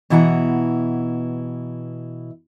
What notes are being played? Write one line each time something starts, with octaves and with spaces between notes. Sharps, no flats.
B2 E3 E4 F#5 G#5 A#5